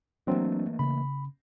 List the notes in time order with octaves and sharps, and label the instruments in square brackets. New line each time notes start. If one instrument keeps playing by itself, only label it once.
[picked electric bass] E3 A3 A#3 [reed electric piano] F#3 C4 D4
[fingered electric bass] C#3 C#4 [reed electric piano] B5